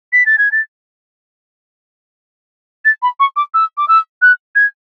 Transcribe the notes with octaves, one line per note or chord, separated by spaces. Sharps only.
B6
A6
G#6
A6
A6
B5
C#6
D6
E6
D6
E6
F#6
G#6